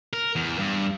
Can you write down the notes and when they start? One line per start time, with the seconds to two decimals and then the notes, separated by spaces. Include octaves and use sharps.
0.13 A#4
0.36 E2
0.59 G2